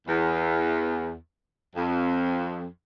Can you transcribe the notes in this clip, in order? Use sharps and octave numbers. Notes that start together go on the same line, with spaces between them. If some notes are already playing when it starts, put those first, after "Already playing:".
E2
F2